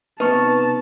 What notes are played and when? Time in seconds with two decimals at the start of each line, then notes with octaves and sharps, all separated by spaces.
0.20 C3 B3 D#4 B4 A5 C#6